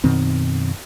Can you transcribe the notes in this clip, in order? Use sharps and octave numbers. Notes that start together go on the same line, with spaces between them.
F#2 B2 D#3 C4